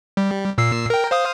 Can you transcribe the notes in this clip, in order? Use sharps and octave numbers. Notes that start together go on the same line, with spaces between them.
G3
A#2 E6 C7
A#4 G5
C5 F5 D#6